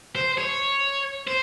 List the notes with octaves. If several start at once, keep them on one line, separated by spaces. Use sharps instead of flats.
C5
C#5
C5